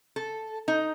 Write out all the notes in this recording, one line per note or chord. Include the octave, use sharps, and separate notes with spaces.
A4
D#4